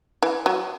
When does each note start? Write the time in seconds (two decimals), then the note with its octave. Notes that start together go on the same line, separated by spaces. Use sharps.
0.22 E3
0.46 F#3